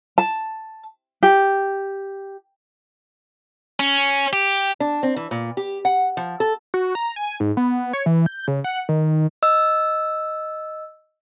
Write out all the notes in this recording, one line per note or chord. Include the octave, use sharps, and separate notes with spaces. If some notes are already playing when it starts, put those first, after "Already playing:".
A5
G4
C#4
G4
D4
C4
E3
A#2
G4
F#5
F3
A4
F#4
A#5
G#5
G#2
B3
C#5
E3
G6
C#3
F#5
D#3
D#5 E6